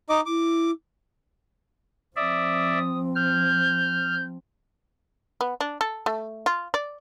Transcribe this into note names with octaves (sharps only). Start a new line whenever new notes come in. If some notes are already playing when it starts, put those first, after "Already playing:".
D#4 D#5 D6
E4 D6
F3 C4 D5 E5 D#6
F6 G6
B3
D4
A4
A3
F4
D5